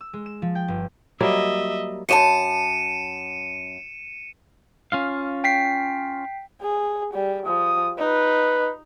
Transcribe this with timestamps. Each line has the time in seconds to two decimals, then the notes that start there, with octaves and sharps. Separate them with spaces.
0.01 E6
0.13 G#3
0.26 E7
0.42 F3
0.55 G5
0.68 G1
1.21 F#3 G3 A#3 D#5 E5
2.09 F#2 G4 A5 C#7 D#7 E7
4.92 C#4 F4 F5
5.44 G5 B6 C7
6.62 G#4
7.13 G3
7.46 F3 D#6
7.98 D#4 B4